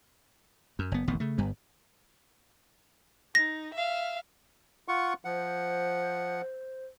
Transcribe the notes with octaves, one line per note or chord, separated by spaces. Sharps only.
F#2
F#1 B3
E1 A1 D#3 B3
C#3 A3
G1 G2 G3 B3
D#4 A#6
E5 F5
F4 F#5 C#6
F3 C5 F#5